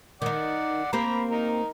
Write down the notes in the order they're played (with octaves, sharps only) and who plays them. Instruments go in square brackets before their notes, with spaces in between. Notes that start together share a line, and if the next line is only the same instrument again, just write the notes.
[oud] D#3 D#4 [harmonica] D5 F#5
[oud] A#3 C4 G4 [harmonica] A#5 B5
[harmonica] D#4 A#4